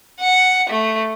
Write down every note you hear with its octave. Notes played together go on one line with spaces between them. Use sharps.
F#5
A3